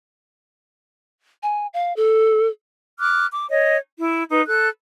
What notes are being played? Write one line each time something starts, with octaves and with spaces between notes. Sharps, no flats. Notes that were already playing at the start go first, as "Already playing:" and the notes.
G#5
F5
A4
D6 F6 F#6
D6
C#5 D#5
E4
D#4 B4
A4 F#6